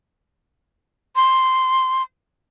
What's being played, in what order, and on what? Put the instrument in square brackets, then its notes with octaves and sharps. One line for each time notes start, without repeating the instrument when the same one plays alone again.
[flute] C6